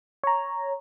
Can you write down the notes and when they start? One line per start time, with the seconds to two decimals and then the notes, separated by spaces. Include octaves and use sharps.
0.24 C#5 A#5